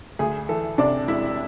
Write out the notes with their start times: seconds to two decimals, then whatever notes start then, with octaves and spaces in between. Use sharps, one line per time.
0.19 D2 G#4
0.49 E3 A4
0.78 C3 D4 D5
1.08 E1 E4 E5